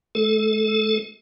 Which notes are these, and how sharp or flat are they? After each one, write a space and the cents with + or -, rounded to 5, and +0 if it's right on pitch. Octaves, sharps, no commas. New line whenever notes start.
A3 -45 A4 -15